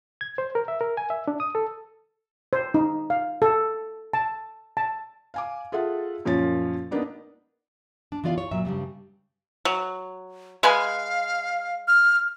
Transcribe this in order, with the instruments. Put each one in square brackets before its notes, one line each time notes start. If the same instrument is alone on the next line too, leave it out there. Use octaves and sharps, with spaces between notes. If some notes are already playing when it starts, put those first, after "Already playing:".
[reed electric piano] G#6
C5
A#4
E5
A#4
G#5
E5
D4
D#6
A4
[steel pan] C5
D#4
F5
A4
A5
A5
[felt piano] F5 G#5 D6
F4 G#4 A4 E5 F#5
F#2 A#2 F3 F4 C#5 A6
A#3 B3 D4 D#4
[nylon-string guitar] D4
E3 B3 F4 D5 F5
C#5
A#2 F#3 E5
G2 A#2 C#3 G3
[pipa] F#3
[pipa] G#3 B4 G#5 [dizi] F5
[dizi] F6